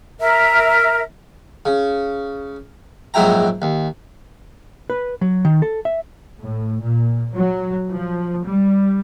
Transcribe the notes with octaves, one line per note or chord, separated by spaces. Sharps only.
A#4 E5
C#3
A#1 G#2 F#3 E4 G5 A#5
D#2
B4
F#3
D#3
A4
E5
A2
A#2
F#3
F3
G3